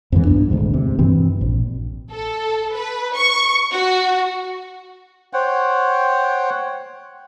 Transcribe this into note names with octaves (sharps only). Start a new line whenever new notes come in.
F2 G#2 E3
B1 G2 B3 D4
D#1 G#1 D2 G#2
G#2 C3
G2 B2 E3 C4
A#1
A4
B4
C#6
F#4
C5 C#5 F#5 G5